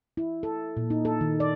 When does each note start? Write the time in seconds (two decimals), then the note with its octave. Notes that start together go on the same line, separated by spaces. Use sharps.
0.17 E4
0.43 A4
0.77 A#2
0.90 D#4
1.05 A4
1.21 D#3
1.40 D5